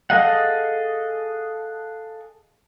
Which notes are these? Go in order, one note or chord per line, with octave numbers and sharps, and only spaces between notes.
G#4 A4 D#5 F5 F#5